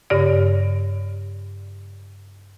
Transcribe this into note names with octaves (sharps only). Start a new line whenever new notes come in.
G2 C#3 D5